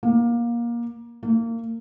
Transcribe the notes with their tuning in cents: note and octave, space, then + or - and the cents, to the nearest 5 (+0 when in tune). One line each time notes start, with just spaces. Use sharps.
A#3 +20
A#3 -25